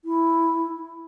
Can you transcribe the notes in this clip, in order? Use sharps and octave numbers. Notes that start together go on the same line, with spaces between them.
E4